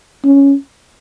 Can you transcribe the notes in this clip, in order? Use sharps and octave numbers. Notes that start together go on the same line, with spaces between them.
C#4